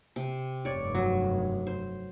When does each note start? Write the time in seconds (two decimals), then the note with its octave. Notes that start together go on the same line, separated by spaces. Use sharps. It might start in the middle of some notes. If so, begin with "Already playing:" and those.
0.16 C3
0.65 F1 G2 C#5 D5
0.95 F#3
1.67 C5